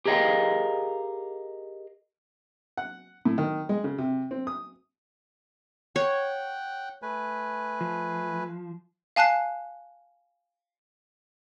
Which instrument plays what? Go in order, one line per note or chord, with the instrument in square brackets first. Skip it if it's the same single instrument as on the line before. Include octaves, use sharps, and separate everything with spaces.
[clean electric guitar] G4 G#4 A#4 D#5 F5 G5
[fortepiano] F#5
A2
D#3
G#3
C#3
C3
C4
D#6
[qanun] C#5 [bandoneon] F#5 G5
[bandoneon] A3 B4 G#5
[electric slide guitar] F3
[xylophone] F5 G#5 A5 F#6 C7